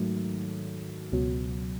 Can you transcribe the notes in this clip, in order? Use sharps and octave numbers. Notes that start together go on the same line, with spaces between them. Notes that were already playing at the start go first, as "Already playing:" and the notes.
Already playing: G#2 D#3 F#3 A3
C#2 B2 F#3